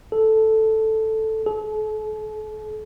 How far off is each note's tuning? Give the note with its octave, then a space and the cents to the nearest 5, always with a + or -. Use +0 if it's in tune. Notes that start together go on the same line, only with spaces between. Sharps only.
A4 +0
A4 -40